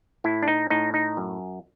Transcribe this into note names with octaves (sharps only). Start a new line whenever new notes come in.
A2 E4
D4
D#4
A2 D#4
D#4
F#2